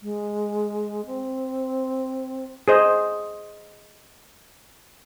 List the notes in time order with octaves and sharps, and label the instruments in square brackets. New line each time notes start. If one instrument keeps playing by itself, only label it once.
[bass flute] G#3
C4
[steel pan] G#4 C5 D#5